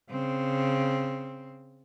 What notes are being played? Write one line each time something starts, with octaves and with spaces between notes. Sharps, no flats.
C#3 C4